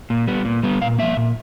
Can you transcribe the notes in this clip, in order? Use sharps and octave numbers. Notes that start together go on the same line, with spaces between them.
A#2
G3 B3
A#2
G3 B3
A#2 F5
F3 A#3 E5
A#2